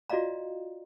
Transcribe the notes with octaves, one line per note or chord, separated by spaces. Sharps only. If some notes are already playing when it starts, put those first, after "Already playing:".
F4 F#4 D5 D#5 F5 A#5